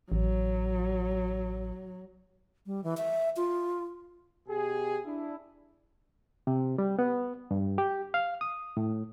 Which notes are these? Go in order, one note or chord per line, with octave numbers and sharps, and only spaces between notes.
A1 F#3
G3
E3
E5
F4
B2 G4 G#4
D4 E4
C3
G3
B3
G2
G4
F5
D#6
A2